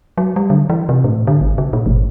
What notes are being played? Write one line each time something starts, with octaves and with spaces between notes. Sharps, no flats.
F#3
G3
D3
E3
C3
A2
D3
G#1
C#3
A#2
G1